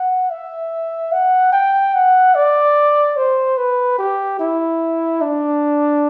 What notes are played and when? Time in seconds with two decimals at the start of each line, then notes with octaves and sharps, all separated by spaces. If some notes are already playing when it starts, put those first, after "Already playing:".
Already playing: F#5
0.31 E5
1.13 F#5
1.53 G5
1.94 F#5
2.35 D5
3.17 C5
3.58 B4
3.99 G4
4.40 E4
5.22 D4